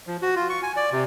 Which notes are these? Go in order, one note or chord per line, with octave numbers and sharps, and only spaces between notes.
F3
F#4
F4
C#6
G#5
D5
C3